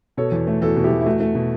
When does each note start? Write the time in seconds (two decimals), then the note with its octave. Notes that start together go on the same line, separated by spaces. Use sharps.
0.17 B2 A4 C#5
0.32 E2
0.47 A3
0.61 E2 F#4 A4
0.76 B2
0.84 E4 G4
0.91 E2
1.01 E4
1.06 A3 F#4
1.20 A3
1.35 B2